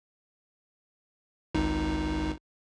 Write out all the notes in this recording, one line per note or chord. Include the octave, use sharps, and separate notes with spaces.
G#1 C#2 D#4